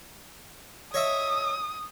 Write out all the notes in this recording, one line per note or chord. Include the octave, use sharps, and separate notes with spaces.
C#5 D#5 E5 D#6